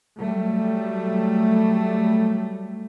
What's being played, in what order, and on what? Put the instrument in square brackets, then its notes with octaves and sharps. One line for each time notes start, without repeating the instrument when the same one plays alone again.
[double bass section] F#3 G3 A3